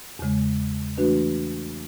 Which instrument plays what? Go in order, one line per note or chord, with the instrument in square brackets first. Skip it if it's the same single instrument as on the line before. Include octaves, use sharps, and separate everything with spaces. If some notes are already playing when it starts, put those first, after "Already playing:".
[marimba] E2 C#3 G#3
E3 A3 D4 F#4 B4